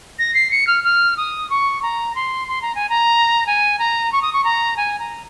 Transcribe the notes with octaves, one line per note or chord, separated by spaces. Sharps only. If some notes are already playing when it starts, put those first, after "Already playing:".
A#6
C7
C#7
F6
F6
D#6
C#6
A#5
C6
C6
A#5
G#5
A#5
G#5
A#5
C#6
D#6
C#6
A#5
G#5
A#5